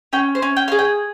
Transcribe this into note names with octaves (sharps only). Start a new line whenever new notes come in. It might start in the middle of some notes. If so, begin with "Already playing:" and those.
C#4 G5
C5
C#4
G5
G#4 F5
G5